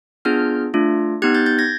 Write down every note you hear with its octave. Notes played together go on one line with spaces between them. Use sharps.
B3 D4 F4 G#4 F6 G6
A3 D4 F4
B3 D#4 G4 F#6 G#6
G6 A6
G6 A6
G#6 A#6